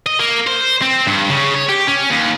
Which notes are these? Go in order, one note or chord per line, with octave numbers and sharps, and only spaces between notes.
D#5
A#3
C5
C4
G2
C#3
C#5
G4
C#4
D#2